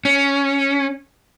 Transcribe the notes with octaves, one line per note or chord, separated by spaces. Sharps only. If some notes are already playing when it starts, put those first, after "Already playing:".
C#4